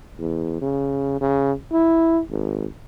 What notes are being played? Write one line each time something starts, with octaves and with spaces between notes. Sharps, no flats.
E2
C#3
C#3
E4
G#1